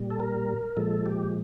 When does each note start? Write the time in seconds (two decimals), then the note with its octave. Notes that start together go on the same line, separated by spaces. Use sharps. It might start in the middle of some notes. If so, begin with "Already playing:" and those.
Already playing: A#2 G3
0.10 A4
0.20 A#4
0.77 A#2 F3 G#3 A4
1.06 G4